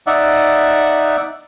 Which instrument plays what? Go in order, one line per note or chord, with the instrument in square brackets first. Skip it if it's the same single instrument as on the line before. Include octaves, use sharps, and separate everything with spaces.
[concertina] D#4 D5 E5 F#5